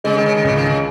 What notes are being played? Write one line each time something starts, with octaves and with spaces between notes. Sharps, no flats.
C#3 G#3
D#3
C#3
D#3
C#2 C#3
D#3
C#3